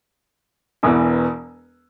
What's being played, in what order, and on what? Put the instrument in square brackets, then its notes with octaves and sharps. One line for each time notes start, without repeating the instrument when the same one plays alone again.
[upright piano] E1 E2 E3 B3